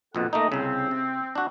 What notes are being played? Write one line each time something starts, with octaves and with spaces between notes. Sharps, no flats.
A#1 F2 B2 A4 F#5
A3 A#3 D#4 D#5
C2 C#3 C4
C3
D4 F#4